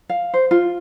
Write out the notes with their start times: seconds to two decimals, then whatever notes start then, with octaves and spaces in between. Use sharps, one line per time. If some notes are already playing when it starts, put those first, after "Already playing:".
0.09 F5
0.34 C5
0.51 F4